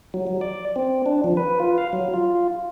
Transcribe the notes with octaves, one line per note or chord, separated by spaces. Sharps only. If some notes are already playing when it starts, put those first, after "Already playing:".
F#3
F#3
D5
C4
D4
F3
B4
F4
F5
F#3
F4